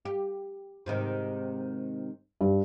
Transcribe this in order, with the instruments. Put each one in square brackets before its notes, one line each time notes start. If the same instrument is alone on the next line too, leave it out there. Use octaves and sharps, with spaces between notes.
[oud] G4
G#2 C3 D#3
[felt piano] G2